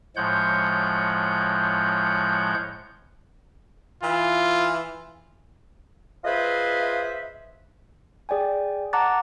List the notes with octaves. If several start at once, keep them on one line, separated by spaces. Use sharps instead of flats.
A2 F3 G#3 C#5 F#5 G6
E3 F4
F4 G#4 B4 C5 D#5 E5
G#4 D5 G5 G#5
F#5 A5 A#5 D6 F#6 A6